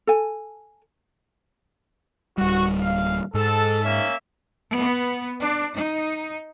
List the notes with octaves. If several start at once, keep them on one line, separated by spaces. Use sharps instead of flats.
A4 G#5
D1 G3 F#4
F5
G#2 A4
A#3 C#4 E5
B3
D4
D#4